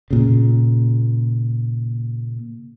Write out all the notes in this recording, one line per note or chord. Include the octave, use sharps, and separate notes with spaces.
A#2 C#3